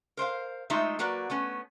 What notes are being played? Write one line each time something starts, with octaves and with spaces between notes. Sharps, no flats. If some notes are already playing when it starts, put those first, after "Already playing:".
A#4 C5 D#5 F5
G#3 A3 D#4 F4 D#5 E5
F#3 A#3 F#4 B4 D5
A3 B3 C#4